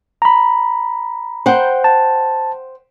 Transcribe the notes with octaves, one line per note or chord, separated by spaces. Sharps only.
A#5 B5
C5 F#5 G5
A5